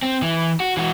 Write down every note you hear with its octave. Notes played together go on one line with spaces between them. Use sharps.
C4
E3
F#4
E3 F#4